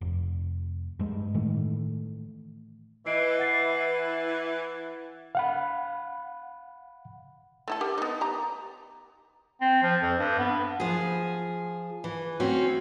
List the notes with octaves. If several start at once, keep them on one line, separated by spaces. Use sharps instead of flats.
F1
G2 G#3
A2 D#3 E3 A3
E3 D#5 C7 D7
F#5 A6 C7
F5 F#5 B5
A3 E4 A4
G4 A#4 F#5
B3 D#4
G4 A#5
C4
F3
F2
G2
B3
F3 G#4
E3
A3 C4 C#4 F#4